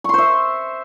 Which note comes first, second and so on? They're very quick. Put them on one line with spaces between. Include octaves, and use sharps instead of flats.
C#6 C6 C5 E5